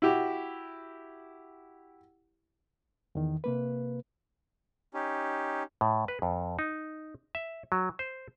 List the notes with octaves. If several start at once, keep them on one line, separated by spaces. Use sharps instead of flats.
E4 F#4 G4
E2 D#3
C3 A#3 B4
C#4 D#4 G4
A2
B4
F2
D#4
E5
F#3
C5